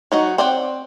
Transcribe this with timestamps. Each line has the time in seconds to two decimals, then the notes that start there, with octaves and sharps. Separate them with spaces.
0.12 F#3 D#4 F#4
0.38 C4 D5 F#5 G5